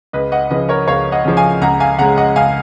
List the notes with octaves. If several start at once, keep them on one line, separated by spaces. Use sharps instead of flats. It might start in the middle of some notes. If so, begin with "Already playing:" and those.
C#2 B4 D#5
D#5 F#5
C#3 F3 B4 D#5
A#4 C#5
C#2 C#5 F5
D#5 F#5
C#3 F3
F5 G#5
C#2 F#5 A#5
F5 G#5
C#3 G#3 F#5 A#5
D#5 F#5
C#2 F5 G#5